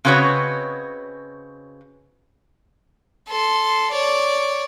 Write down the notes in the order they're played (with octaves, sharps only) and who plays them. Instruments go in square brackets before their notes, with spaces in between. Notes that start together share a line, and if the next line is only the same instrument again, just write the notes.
[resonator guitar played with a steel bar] C#3 C4 F#4 B4 C#5 D#5
[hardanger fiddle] A4 C6
C#5 D5